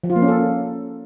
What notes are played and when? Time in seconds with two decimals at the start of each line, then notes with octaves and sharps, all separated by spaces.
0.04 F3
0.10 F4
0.16 A#3
0.22 C#4
0.28 A4